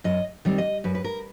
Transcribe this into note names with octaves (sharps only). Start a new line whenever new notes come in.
F#2 D#5
D#3 G3 C4
D#5
F#2 B4
B4
A#4